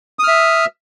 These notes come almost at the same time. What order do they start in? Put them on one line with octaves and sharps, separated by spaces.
D#6 F6 E5